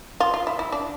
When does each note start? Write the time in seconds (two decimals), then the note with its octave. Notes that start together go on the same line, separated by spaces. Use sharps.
0.20 F4
0.34 F4
0.47 E4
0.59 E4
0.72 D4